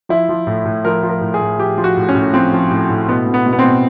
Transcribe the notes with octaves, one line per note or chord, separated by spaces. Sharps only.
F3 E4
F3
A2
A2
F3 A#4
F3
A#4
A2
G#4
A2
F3 G4
F3
F#4
A2
C#4
A2
F3 C4
F3
A2
A2
B2 B3
B2
B3
B2
B3
C4
B2